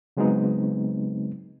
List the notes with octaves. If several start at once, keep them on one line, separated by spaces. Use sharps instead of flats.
C#3 F#3 G#3 B3 C4 D#4